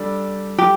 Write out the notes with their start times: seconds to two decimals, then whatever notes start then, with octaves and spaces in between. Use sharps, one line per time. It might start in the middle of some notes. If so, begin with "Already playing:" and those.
Already playing: G3 D4 A4
0.58 G4